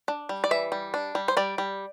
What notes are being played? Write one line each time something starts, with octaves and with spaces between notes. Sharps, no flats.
D4
G3
D5
E3 E5
G3
D4
G3
C5
G3 D5
G3